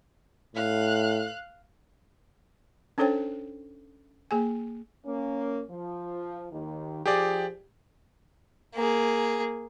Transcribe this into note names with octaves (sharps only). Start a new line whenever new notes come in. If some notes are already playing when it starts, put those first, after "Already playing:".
A2 F5 F#6
C#4 D4 A4 C5 C#5 G5
A#3 G#4 G#5
A#3 C#4
F3
D#2 D#3
F3 G4 G#4 D5
A#3 G#4